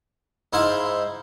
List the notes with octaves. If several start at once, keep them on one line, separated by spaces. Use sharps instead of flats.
G#2 E4 C5 F5